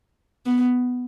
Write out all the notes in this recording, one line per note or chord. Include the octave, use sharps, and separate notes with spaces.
B3